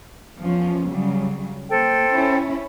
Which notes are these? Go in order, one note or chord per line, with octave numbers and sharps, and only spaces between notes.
E2 F3 C#4
C#3 F#3 G3
A#3 A4 C5 G5
C#4 E4